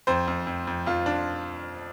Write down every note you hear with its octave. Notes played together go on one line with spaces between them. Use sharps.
F2 C5
F2
F2
F2
F2 F4
D4